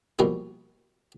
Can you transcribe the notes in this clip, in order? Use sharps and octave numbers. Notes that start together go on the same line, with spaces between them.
B2 F3 G3 A#3 E4